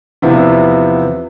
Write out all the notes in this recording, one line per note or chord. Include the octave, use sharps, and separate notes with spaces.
E2 C3 F3 B3 E4